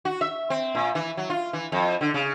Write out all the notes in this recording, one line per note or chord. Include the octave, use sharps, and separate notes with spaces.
F#4
E5
C4
A#2
E3
F#3
F4
E3
F2
D3
C#3